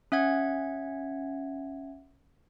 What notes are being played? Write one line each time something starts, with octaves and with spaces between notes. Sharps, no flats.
C#4 E5 F#5 G#6